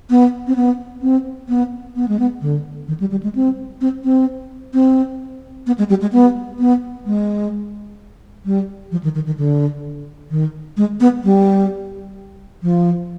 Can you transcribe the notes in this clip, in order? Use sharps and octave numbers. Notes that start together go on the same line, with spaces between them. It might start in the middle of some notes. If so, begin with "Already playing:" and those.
B3
C4
B3
C4
B3
B3
G#3
B3
D3
D#3
G3
G3
G#3
C4
C4
C4
C4
B3
G#3
G3
G#3
B3
B3
G#3
G3
F3
D#3
D#3
D#3
D3
D#3
G#3
B3
G3
F3